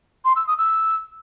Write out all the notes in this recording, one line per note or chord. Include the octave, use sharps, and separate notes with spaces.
C6
E6
D#6
E6